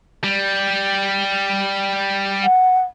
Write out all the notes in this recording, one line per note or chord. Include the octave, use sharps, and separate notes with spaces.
G3
F#5